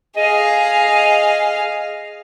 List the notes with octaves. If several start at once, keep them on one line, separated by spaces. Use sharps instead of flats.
G#4 D#5 F5